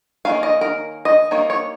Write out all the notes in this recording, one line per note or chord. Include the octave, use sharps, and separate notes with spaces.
D#3 A#3 C#4 F5
D#5
A#4
D#5
G3 A#3 D#4 C#5
C#5